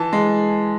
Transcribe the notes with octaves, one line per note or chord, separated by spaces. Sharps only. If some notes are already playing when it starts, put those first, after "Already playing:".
Already playing: E3 A5
G#3